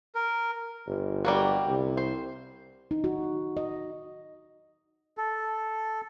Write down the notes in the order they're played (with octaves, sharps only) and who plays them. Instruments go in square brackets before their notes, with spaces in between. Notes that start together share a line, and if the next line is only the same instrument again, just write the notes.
[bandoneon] A#4
[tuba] G1
[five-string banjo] G3 A#3 F#4
[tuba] C2
[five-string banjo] C5
[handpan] D#4
F#4
D#5
[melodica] A4